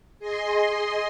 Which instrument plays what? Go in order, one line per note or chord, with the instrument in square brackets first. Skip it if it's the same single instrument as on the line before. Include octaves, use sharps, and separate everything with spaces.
[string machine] G#4 D#5 C6